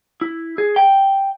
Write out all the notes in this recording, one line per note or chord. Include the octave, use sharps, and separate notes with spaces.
E4
G#4
G5